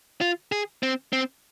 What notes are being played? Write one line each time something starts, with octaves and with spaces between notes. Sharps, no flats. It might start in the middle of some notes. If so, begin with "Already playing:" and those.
F4
G#4
C4
C4